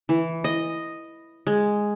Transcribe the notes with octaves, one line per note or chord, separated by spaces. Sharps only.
E3
D#5
G#3